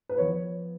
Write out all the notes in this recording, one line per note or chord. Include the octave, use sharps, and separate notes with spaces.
B4
F3 B3 C#5